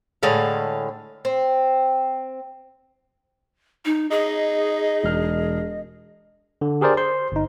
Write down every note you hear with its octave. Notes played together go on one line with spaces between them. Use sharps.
A2 D3 G#3 F5
C4
D#4
D#4 G#4 D#5
E1 F6
D3
G4 G#4 A#4 C5 D5
C5 C6
G1 D#4